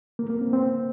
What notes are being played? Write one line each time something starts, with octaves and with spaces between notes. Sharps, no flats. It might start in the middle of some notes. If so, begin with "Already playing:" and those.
A#3
A#3
C4
C4